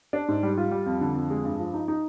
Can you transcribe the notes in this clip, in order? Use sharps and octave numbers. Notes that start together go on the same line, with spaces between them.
D4
G#2
G3
F4
G3
F2
D3
F2
G#3
G2
F3
D#4
D#4